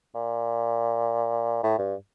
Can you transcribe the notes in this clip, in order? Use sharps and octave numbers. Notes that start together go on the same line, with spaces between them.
A#2
A2
G2